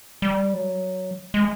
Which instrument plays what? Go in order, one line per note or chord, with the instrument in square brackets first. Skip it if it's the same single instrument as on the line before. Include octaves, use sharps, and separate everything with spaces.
[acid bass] G3
F#3
G#3